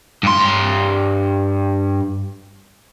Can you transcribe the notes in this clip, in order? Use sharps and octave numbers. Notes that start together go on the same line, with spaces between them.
G2 C6